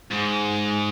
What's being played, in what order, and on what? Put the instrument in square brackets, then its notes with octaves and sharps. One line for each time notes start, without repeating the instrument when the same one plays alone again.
[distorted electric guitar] G#2